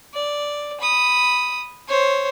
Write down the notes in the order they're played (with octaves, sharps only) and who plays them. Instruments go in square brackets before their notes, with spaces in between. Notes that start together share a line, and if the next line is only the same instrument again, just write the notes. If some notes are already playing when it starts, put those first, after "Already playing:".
[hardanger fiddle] D5
B5 D#6
C5 C#5